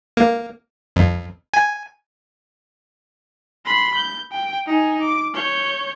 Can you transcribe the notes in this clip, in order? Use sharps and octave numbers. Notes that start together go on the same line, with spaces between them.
A#3
F2
G#5
B5 C6
G6
G5
D#4 G#5
D6
C#5 G6